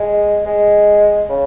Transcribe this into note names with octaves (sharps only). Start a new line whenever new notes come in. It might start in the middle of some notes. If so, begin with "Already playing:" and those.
Already playing: G#3
G#3
C#3